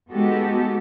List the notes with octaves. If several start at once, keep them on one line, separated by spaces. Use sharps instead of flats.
G#3 B3 D#4 F#4 G4 A4